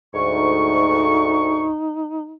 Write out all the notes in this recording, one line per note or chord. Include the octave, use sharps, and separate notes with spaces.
D2 G#2 C#6
D#4